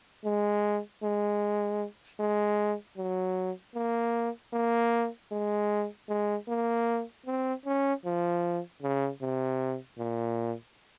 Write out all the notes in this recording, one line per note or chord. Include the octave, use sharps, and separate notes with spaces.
G#3
G#3
G#3
F#3
A#3
A#3
G#3
G#3
A#3
C4
C#4
F3
C#3
C3
A#2